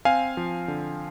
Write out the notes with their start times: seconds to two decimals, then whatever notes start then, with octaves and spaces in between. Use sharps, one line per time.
0.05 C4 F5 G#5
0.37 F3
0.68 D3